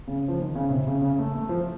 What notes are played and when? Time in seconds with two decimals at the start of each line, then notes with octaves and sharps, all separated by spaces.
0.08 C#3
0.28 F3
0.40 D#3
0.55 C#3
0.70 C3
0.87 C#3
1.02 C#3
1.19 A3
1.35 A3
1.49 F3